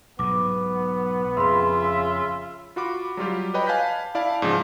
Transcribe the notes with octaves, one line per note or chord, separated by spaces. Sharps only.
B1 G#2 B3 D6
F2 C#3 F4 E5 B5 C6
F4 F#4 B5 D6
F#3 G3 F4 G4
B4 C#5 D#5 G5 B5
F5 G#5 A5 F#6 G6 B6
E4 D5 F5 A5
G#2 C#3 F3